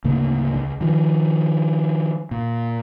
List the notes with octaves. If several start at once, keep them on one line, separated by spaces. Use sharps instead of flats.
D2 G#2 C#3 A#3
C#2
D#3 F3
A#2